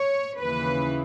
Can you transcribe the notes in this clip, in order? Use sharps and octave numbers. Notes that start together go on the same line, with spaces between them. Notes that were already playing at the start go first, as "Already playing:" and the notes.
Already playing: C#5
D#2 C#3 E3 B4